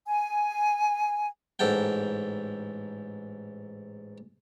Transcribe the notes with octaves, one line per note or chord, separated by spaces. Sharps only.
G#5
A1 G#2 A4 F#5 G5